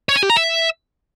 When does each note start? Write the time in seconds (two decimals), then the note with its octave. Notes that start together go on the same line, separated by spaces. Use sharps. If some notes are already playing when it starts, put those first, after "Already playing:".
0.09 C#5
0.16 G#5
0.23 G4
0.30 A#5
0.37 E5